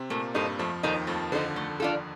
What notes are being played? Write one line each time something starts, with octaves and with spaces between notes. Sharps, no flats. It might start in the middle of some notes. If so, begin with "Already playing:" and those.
Already playing: C3 C4
A#2 A3 A#3
G2 G3 D#4 A4 C5
F2 F3 A3
D#2 D#3 D#4 A4 C5
F2 F3 A3
D3 D#4 A4 C5
A3
D4 F4 A4